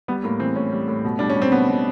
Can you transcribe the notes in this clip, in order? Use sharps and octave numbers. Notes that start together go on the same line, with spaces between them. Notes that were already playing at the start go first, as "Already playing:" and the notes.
G3 B3
A2 A#3
E3 C4
A2 C#4
G3
A2
B2
G3 D4
C#4
G3
C4
B2 B3
B2